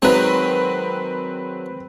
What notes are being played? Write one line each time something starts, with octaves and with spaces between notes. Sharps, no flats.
D#3 F#3 G#3 C4 B4